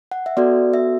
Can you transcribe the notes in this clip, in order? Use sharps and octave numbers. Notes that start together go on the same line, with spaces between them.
F#5
E5
B3 F#4 A4 D5
E5